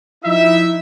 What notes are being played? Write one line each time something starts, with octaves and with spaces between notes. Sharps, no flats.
F3 D#4 E4 E5